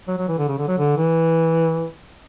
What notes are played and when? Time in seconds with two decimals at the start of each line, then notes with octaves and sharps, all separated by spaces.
0.08 F#3
0.18 F#3
0.28 E3
0.39 D3
0.48 C#3
0.58 D3
0.68 F#3
0.78 D3
0.97 E3